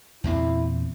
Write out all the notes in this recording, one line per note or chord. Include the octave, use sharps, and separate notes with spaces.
E2 A#2 C4 E4